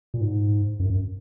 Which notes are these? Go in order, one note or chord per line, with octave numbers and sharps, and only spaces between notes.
A#2
G#2
F#2
F#2